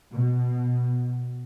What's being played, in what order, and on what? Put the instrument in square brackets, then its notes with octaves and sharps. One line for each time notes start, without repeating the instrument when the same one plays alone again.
[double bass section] B2